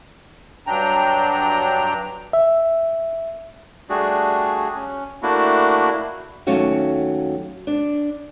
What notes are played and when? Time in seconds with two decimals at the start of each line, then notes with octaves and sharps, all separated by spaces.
0.67 G2 F#3 D4 G5 A#5
2.33 E5
3.89 G3 A3 D4 F#4 G#4
4.75 C#4
5.23 A3 A#3 D4 E4 F#4
6.47 D#2 F#3 A3 C#4 F#4 F5
7.67 D4